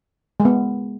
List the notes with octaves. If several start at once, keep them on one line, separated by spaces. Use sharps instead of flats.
G#3
B3